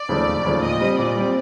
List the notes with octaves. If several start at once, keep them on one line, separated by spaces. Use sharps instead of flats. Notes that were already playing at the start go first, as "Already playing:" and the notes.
Already playing: D5
D#2 C#3 F3 A3
E1
D#2 C#3 F3 A3
A#2 D#5
G3 C4
A#2 D5
G3 C4